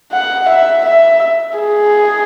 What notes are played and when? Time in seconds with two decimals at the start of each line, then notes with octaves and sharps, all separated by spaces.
0.13 F#5
0.50 E5
0.86 E5
1.59 G#4